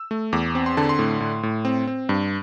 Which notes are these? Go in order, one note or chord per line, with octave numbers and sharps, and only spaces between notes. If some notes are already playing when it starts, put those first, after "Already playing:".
Already playing: E6
A3
E2 D6
C4
C6
D3 A5
C6
A2
A2
A2
C4
C4
G2